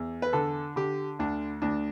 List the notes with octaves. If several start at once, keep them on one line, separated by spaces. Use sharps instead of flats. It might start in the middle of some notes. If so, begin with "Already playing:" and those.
Already playing: E2
B4
D3 A4
D3 G4
D2 D4
D2 D4